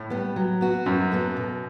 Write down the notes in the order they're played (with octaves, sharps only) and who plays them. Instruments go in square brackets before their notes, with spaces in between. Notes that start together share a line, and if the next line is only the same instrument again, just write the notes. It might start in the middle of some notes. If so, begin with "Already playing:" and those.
Already playing: [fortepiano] A2
[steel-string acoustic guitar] G3 B3
F#3
B3 F#4
[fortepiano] F#2 [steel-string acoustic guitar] F#3
[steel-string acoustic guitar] B3 F#4 A4
B2